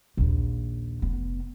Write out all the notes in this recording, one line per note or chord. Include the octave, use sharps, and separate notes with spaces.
A#1 D#2
F1 B3